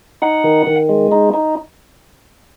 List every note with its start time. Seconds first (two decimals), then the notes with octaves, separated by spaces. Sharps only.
0.22 D#4 F#5
0.44 D#3
0.67 D#3
0.89 G#3
1.12 D#4
1.34 D#4